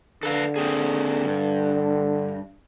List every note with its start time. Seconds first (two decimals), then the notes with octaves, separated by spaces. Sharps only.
0.23 D3 A4 B4 F5
0.56 A#3 C4 G#4
1.25 G2